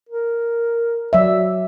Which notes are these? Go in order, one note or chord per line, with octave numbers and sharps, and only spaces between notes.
A#4
F#3 D5 E5